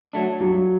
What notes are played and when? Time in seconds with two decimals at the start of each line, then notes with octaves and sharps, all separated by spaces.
0.13 F#3 A3 D4
0.40 G2 F#3